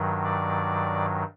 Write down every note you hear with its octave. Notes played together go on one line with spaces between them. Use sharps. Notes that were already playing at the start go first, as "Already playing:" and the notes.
Already playing: G2 D#3 F#3
D5